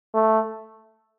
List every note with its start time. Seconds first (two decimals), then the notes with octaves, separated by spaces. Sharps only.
0.14 A3